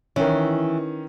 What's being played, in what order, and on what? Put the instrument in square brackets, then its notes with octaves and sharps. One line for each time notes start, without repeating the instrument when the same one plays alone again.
[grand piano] D#3 C#4 [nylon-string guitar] E3